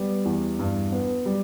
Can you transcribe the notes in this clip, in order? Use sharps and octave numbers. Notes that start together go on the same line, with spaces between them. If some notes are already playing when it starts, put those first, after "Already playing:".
Already playing: G3 B3
E2
G2
B3
G3